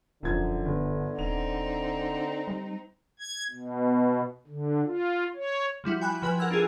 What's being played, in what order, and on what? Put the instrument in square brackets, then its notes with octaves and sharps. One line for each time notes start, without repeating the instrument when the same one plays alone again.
[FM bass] E1 [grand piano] F#2 F3 G#6 [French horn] D3
[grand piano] G1
[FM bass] D#1 [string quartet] C4 D#4 [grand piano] F7
[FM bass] G3
[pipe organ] G#6
B2
D3
F4
C#5
[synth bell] F3 G3 E4 F#4
G5 G#5 B5 F#6
F3 B4 G#5 F6 F#6
A#4 F#5 E6 G#6
D4 F4 G#4 A4